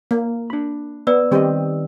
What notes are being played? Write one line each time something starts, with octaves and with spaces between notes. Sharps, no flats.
A#3
D4 B5
B3 B4 D5 E6
D#3 G3 C4 G4 D#5